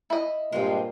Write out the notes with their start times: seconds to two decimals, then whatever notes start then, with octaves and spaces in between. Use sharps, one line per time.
0.10 E4 D#5
0.52 G2 A#2 G#3 C4 F4